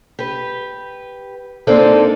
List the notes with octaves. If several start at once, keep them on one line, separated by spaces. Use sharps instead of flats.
G4 B4
G#3 A#3 C4 D4 D#4 A4